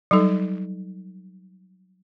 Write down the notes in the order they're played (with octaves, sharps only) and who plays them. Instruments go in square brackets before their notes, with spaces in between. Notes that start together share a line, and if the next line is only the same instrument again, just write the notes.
[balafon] F#3 G3 D#4 A4